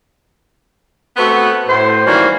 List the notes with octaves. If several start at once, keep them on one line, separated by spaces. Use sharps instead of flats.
A3 B3 C4 F#4 B4
A2 C5
D#3 E3 F#3 G3 A#3 C#4